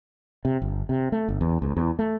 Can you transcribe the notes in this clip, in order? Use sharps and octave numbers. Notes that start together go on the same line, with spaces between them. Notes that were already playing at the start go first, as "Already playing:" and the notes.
C3
G1
C3
A3
G1
E2
C#2
E2
A3